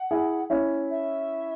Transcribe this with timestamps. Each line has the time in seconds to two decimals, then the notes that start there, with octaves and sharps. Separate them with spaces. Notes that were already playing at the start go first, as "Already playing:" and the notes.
Already playing: F#5
0.11 E4 G#4
0.50 C#4 E4
0.90 E5